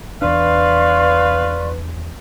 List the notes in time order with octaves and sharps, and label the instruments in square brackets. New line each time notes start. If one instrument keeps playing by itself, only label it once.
[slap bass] E2 D4 [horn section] B4 [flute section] D5 C6 C#6 [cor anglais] F5